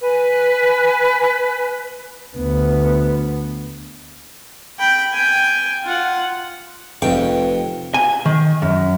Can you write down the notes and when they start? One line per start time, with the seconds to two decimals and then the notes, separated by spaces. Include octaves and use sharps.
0.01 B4 G#5
2.36 D2 B3
4.80 G5 B5
5.13 G5 G#5
5.83 F4 F#5
7.02 F1 F2 B4 G5 C#6
7.94 G#5
8.26 D#3
8.62 F#2